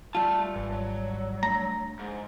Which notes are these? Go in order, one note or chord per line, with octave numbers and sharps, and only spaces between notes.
G3 A3 F4 A5
G#1 E3
F#3
A3 D4 A#5
G#2